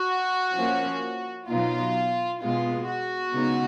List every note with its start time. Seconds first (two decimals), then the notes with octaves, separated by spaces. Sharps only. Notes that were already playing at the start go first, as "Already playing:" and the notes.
Already playing: F#4
0.55 F3 A#3 C#4
1.48 B2 F#3 B3 D#4 F4
2.41 B2 G#3 B3 F4
2.87 F#4
3.34 C#3 G#3 B3 D#4